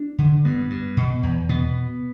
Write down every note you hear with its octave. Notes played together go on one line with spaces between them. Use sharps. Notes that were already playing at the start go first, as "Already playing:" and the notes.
Already playing: D4
D3
G2 B3
G2
B2
E2
B2 B3